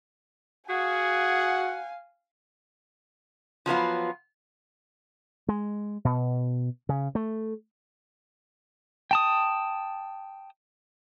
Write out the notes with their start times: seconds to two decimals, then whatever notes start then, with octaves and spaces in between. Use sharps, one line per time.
0.69 F#4 G#4 F5 F#5 G#5
3.66 F3 F#3 B3 F4
5.49 G#3
6.05 B2
6.89 C#3
7.15 A3
9.11 G5 A5 D#6